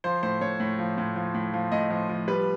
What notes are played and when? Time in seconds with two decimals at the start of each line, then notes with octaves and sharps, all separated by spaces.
0.04 F3 C5
0.23 A2 C5
0.41 A2 C#5
0.60 A2
0.79 F3
0.98 A2
1.16 F3
1.35 A2
1.54 F3
1.72 A2 D#5
1.90 F3
2.09 F3
2.28 G3 B4